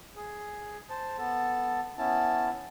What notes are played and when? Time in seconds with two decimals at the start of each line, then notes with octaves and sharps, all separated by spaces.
0.16 G#4
0.90 C5 A5
1.18 B3 A4 A5
1.98 B3 C#4 E4 A5